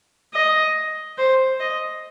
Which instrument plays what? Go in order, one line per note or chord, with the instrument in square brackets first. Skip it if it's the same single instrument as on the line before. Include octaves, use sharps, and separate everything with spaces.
[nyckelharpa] D#5
C5
D#5